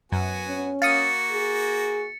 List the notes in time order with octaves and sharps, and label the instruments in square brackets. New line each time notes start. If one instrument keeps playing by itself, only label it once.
[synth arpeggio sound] F#2 [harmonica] B3 F#4 G#5
[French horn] C#4
[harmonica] A#3 F#4 [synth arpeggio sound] F5 D#6 [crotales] A6 C#7
[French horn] G#4